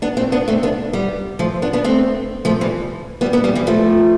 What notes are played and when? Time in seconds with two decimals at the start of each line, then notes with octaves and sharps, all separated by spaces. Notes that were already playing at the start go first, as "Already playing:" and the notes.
0.02 B3 D4
0.17 A3 C4
0.32 B3 D4
0.48 A3 C4
0.63 B3 D4
0.93 G3 B3
1.39 F3 A3
1.62 B3 D4
1.73 B3 D4
1.84 A3 C4
2.45 F3 A3
2.61 E3 G3
3.21 G3 B3
3.33 B3 D4
3.44 G3 B3
3.55 E3 G3
3.67 F3 A3